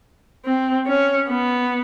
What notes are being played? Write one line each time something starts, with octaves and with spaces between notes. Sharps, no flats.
C4
C#4
B3